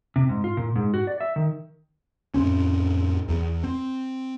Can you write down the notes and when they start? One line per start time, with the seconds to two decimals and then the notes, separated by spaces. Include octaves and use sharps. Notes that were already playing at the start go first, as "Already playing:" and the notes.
0.16 C3
0.29 G#2
0.44 F4
0.57 A#2
0.76 G#2
0.94 F#4
1.07 D5
1.21 E5
1.36 D#3
2.34 F2 A2 C4 C#4
3.28 E2
3.64 C4